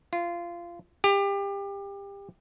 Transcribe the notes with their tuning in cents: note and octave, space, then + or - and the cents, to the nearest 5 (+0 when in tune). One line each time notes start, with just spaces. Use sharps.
F4 -20
G4 +25